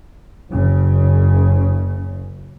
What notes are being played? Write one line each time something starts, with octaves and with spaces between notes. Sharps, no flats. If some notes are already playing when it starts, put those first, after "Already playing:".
F#1 C#3